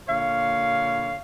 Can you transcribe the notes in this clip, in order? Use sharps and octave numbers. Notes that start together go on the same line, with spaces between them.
A#2 D3 C#5 F5